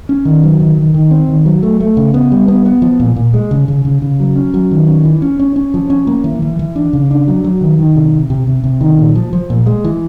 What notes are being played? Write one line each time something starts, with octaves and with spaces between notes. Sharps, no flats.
C#4
D#3
F#3
D#3
D#3
D#3
C4
D#3
F#3
A3
A3
C#3
B3
G3
B3
B3
F3
A#2
A#2
G#3
C#3
C#3
C#3
C#3
F#3
C#4
F#3
D#3
C#4
E3
C#4
C#4
C#4
F3
C#4
A#3
E3
E3
E3
D4
C#3
D4
F#3
F#3
D#3
D#3
C3
C3
C3
C3
C3
D#3
A#2
F3
F3
A#2
G#3
E3